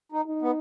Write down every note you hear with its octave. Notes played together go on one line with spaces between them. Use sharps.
D#4
D#4
B3